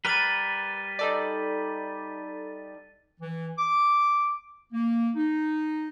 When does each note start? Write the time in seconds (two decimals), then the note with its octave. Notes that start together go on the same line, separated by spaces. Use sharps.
0.05 G3 A#4 B4 A6 D#7 G7
0.99 D#4 A4 D5
3.21 E3
3.58 D6
4.73 A#3
5.16 D#4